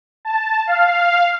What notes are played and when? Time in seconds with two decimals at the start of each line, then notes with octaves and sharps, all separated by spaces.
0.25 A5
0.67 F5